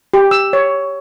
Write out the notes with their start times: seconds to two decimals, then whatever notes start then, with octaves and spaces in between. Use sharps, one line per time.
0.14 G4
0.31 E6
0.53 C#5